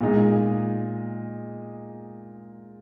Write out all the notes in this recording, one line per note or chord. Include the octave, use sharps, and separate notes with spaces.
A#2 G#3 D#4